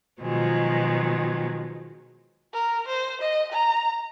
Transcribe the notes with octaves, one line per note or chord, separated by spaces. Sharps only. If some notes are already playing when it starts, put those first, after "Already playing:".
B2 D#3 F3 F#3 G#3
A#4
C5
D#5
A#5